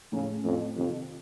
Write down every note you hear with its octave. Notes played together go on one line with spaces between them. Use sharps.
A2 C#3 A3 C#4
F2 A2 A3 C#4
F2 C3 D#3 A#3